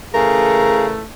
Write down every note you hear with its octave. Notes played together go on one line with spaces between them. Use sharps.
C#3 E3 A3 G#4 A#4 F5